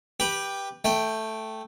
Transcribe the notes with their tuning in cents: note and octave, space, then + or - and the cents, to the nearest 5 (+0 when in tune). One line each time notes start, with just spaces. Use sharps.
G4 +5 B4 -15
A3 +0 G5 +0